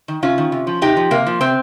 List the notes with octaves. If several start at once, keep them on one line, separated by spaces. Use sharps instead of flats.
D#3
C3 C#4 F4
D#3
C3
F3
C3 D#4 G4
F3
C3 A#3
F3
C3 C4